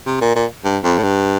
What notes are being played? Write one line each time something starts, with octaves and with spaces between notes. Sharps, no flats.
C3
A#2
A#2
G2
F2
A2
G2